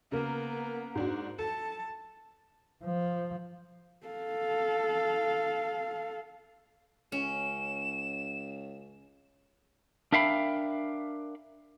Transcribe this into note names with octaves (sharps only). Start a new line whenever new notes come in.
C#3 A#3 B3 A#4
G#2 D4 F#4
A4 A5
F3
A4 F5
C#2 C#4 E7
D4 A#4 E5 F5 G5 B5